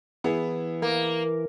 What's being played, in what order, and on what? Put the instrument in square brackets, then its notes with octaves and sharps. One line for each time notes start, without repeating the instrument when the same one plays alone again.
[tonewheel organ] E3 [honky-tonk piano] B3 E4 G#4
[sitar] A#3